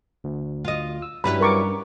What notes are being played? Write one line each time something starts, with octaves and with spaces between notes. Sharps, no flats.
D2
F4 D#5
E6
G2 F#3 G3 C#4 E4 B4 B5
A#4 C#6 D6